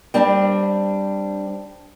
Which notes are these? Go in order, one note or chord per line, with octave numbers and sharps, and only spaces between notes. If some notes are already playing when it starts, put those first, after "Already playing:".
G3 C4 D4